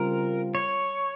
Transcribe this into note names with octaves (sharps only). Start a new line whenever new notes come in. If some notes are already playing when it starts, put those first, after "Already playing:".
Already playing: C#3 G3 C4 F4 A#4
C#5